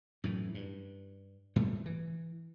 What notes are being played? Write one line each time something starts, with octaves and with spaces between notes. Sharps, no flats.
F#2 A2 E3
G2
G#2 G3 A3
E3